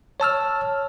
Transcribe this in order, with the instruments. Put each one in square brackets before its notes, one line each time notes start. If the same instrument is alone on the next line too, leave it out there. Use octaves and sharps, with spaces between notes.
[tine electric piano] C#5 A5 E6 F6